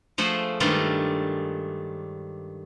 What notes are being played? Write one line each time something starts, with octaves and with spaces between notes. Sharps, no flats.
F3 A3 G#4 C5 F#5
G2 D#3 G#3 A3 D4 F4